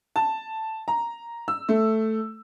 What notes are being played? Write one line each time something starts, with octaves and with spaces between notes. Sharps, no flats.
A5
A#5
E6
A3